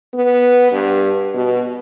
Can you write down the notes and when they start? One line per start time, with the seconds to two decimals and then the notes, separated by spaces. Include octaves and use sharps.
0.14 B3
0.72 G2
1.34 B2